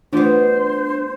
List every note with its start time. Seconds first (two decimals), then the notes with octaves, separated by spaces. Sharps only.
0.13 E3 G3 A3 B3 D4 F4 C5